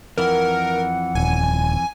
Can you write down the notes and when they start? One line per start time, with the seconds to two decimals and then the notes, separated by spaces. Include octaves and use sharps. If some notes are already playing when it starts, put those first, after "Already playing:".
0.18 F2 E3 A#4 F#5
1.15 D#1 G#5